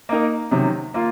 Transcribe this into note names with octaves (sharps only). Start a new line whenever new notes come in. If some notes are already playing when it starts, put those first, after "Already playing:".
A#3 D#4 A#4
C3 D#3 F#3 C#4
A#3 F4